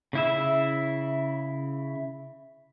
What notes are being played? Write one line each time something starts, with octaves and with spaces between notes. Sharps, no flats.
C#3 E4 E5